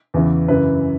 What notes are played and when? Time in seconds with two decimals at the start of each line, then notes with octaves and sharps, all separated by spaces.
0.14 E2 C#3 E3
0.48 F#2 C#3 E3 B4